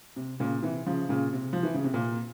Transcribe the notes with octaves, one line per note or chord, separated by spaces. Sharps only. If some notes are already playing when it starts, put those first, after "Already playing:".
C3
A#2 C#3
C3 E3
C#3 F3
A#2 C#3
C3
F3
E3
C#3
C3
A#2